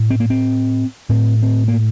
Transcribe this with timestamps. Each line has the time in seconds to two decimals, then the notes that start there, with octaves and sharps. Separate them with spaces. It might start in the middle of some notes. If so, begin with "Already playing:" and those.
Already playing: A2
0.10 C4
0.20 A#3
0.30 C4
1.09 A2 C4
1.43 C4
1.68 A#3